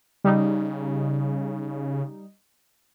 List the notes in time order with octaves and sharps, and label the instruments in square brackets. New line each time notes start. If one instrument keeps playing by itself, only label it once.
[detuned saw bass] C#3 [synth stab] G3 D#4